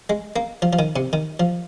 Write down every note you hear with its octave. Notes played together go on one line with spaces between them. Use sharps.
G#3
A#3
F3
F3
D#3
C3
D#3
F3